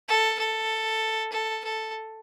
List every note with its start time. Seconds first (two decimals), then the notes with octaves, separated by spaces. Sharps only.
0.08 A4
0.39 A4
1.32 A4
1.64 A4